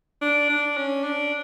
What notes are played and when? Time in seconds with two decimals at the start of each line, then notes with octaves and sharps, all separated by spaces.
0.21 D4
0.49 D4
0.77 C#4
1.04 D4